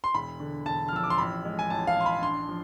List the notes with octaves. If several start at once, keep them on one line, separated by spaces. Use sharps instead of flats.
C6
E1 B5
D3
E1 A5
F6
F3 E6
D6
C6
A1 B5
G#3
G#5
A1 A5
F5
A1 C6
B5
D4 C6
F3